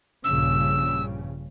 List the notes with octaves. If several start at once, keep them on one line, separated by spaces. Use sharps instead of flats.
A#1 G2 C#3 E6